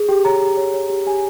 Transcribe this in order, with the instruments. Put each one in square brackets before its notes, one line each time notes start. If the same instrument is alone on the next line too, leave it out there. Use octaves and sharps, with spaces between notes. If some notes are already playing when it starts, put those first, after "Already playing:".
Already playing: [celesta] G#4
G4 G5
C#5 A#5
G4
C#5
C#5
G4
G4 G#5